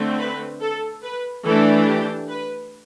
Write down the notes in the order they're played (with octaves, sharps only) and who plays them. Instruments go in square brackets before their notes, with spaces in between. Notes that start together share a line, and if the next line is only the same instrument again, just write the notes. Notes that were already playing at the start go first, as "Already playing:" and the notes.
Already playing: [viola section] D3 A3 C4
B4
A4
B4
E3 A3 D4 A4
G4
B4